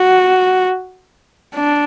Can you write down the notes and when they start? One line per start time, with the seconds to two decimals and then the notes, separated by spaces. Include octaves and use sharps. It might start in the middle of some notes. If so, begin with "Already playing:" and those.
Already playing: F#4
1.55 D4